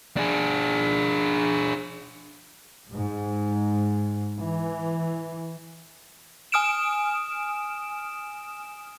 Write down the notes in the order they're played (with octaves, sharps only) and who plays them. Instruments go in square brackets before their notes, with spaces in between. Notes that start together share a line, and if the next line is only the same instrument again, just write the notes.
[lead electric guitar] D4 G#4
[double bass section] G#2
E3
[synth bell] G#5 D#6 F6 D7 E7